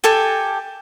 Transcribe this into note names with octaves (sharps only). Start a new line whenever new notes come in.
G4 A4 G#5